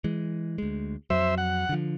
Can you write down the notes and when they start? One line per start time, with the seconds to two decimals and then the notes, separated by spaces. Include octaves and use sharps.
0.04 E3 G#3
0.58 D2 G#3
1.10 F2 F#3 C5 E5
1.38 F#5
1.69 D3 F3